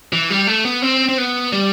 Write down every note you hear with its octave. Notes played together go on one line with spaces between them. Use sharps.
E3
G3
A3
B3
C4
C4
B3
G3